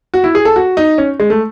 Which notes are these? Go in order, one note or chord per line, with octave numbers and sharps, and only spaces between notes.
F#4
E4
G#4
A4
F#4
D#4
C#4
G#3
A3